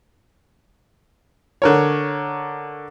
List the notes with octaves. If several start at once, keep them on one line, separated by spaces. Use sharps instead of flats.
D3 A#4 C#5